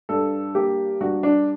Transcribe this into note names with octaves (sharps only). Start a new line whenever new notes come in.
G2 A4
A#3 G4
G2 F#4
D4